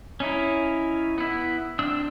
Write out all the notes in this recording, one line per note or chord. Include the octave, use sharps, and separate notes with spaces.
C#4 D#4 E4
B3 E4
C4 D4 E6